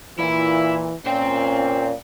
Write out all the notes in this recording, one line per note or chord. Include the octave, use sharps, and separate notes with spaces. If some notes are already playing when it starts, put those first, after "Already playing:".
A#2 E3 E4
A#2 C#4 C5 G5